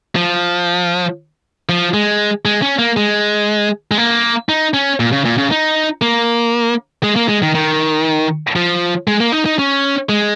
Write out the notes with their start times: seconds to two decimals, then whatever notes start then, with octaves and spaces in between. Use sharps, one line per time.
0.16 F3
1.69 F3
1.94 G#3
2.45 G#3
2.62 C#4
2.79 A#3
2.97 G#3
3.91 G#3
3.98 A#3
4.49 D#4
4.74 C#4
5.00 A#2
5.12 C#3
5.25 A#2
5.38 C#3
5.51 D#4
6.02 A#3
7.03 G#3
7.16 A#3
7.29 G#3
7.42 D#3
7.55 D#3
8.56 F3
9.08 G#3
9.20 A#3
9.32 D#4
9.46 D#4
9.59 C#4
10.09 G#3